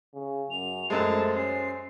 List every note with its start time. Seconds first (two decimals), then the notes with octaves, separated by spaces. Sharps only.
0.14 C#3
0.51 F#2 F7
0.90 F#2 G#3 A3 C5 A5
1.36 C#4 C7